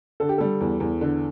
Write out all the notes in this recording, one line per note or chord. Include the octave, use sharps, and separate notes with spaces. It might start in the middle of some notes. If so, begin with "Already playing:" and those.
D3 A4
G4
G3 A4
E2
E2
D3